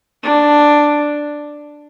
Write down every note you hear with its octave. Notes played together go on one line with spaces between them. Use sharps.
D4